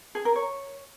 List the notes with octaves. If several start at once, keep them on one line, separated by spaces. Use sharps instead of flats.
G#4
A#4
C#5